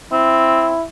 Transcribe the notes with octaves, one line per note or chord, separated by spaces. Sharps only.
C4 E4